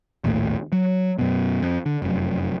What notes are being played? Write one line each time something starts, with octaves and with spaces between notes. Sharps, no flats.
A#1 D#2 A2
F#3
F#2 B2
F2
D3
F1 F#2